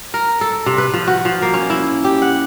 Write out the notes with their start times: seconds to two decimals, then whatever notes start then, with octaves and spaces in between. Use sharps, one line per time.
0.14 A#4
0.41 A4
0.66 C3
0.78 B4
0.94 F3
1.07 F#4
1.25 F3
1.42 A#3
1.54 C#4
1.70 E4
2.04 G4
2.22 F#5